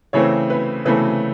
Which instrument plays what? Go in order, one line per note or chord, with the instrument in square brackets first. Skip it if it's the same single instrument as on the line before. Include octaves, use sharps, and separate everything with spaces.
[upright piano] C#3 E3 A3 C4 C#5
B4
C#3 E3 A3 C4 B4